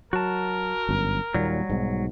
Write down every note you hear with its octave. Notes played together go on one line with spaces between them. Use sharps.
F#3 F#4 A#4 A5
G1 F#2
D#2 A#2 F#3 G3
B1 G#2